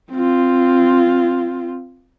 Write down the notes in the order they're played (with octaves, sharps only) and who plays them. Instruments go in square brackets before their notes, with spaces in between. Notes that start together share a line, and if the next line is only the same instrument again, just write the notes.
[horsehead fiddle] C4 F4